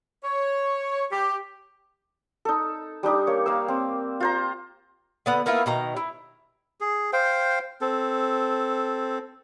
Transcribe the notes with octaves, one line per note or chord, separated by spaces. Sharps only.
C#5
G4
D#4 A4
G3 D4 D#4 G4
A#3 C#5
A#3 F5 E6
C4
F4 C5 A#5
D3 B3 F#5
A#3 B3 E4 F4
B2 D#3 A#5
E4
G#4
C5 F5 G5
C4 A4